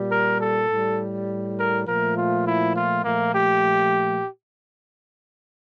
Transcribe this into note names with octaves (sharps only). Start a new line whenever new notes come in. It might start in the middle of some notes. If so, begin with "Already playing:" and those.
Already playing: A#2 G3
A#4
A4
A2 G3
A#4
A#2 F3 A3 A#4
F4
E4
F4
A#2 F3 A3 A#3
G4